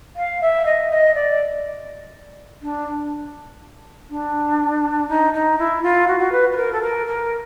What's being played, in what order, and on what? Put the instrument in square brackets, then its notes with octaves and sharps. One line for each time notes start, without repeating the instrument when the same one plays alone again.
[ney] F5
E5
D#5
D#5
D5
D4
D4
D#4
D#4
E4
F4
F#4
F#4
B4
B4
A#4
A4
A#4
A#4